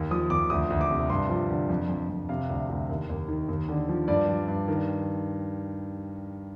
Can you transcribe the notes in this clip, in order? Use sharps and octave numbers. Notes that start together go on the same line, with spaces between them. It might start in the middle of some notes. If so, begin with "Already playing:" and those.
Already playing: D#2
F3 D#6
D#2 D6
D2 D#6
D2
D6
C3
G2 C6
F3
D3
F2
F2
F2
C3 F5
D2
D2
D#2
D#2
D#3
D#2
D3
F3
G2 D5
F3
G2
D#3